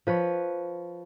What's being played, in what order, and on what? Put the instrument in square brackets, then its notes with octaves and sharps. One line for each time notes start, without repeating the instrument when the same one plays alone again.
[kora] F3 B4 C#5